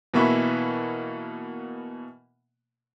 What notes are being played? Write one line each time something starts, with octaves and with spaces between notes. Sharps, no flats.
B2 E3 A#3 B4 E5 C#6